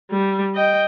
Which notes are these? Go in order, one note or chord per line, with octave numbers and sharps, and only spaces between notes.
G3
D#5 G5